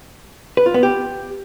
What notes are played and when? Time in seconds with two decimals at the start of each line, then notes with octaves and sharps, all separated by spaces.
0.57 B4
0.66 F4
0.74 B3
0.83 G4